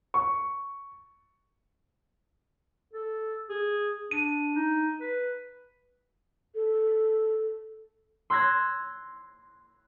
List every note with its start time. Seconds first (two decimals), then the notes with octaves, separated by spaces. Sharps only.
0.14 C#6
2.93 A4
3.49 G#4
4.11 D4 D#7
4.55 D#4
5.00 B4
6.55 A4
8.30 C6 E6 F#6 G#6 A#6